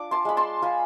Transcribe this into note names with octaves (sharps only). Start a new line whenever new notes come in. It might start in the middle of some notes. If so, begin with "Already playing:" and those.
Already playing: D4 F4 D6
A5 C6
G#3 B5
A5 C6
F4 G#5 B5